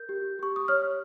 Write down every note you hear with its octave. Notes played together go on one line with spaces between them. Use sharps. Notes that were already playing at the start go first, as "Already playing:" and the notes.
Already playing: A#4 G6
G4
G4 C#6
D#6
C#5 F6